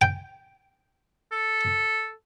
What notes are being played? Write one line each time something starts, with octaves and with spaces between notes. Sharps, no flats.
G5
A4